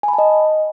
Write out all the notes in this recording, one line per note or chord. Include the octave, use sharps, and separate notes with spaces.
G#5
B5
A5
D#5